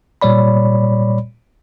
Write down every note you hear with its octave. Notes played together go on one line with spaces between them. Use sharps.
A#2 G3 C#5 D5 B5